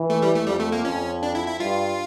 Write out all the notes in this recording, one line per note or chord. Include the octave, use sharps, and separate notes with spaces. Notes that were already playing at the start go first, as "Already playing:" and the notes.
Already playing: E3
A3
G3
A3
F2 G3
A3
A#3
F2 C#4
D4
E4
E4
G2 F4